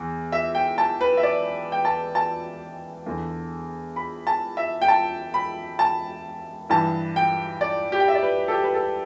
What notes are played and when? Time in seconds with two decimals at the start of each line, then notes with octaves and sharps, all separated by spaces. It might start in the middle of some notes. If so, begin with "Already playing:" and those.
Already playing: E2
0.32 E5
0.55 G5
0.78 A5
1.01 B4
1.17 E5
1.23 D5
1.72 G5
1.85 A5
2.15 A5
3.06 E2 D3
3.96 B5
4.27 A5
4.57 E5
4.82 G5
4.88 A5
5.34 B5
5.79 A5
6.70 G2 E3 A5
7.16 G5
7.61 D5
7.92 G4
8.00 G5
8.08 E5
8.15 D5
8.22 B4
8.48 A4
8.52 G4
8.63 B4
8.74 A4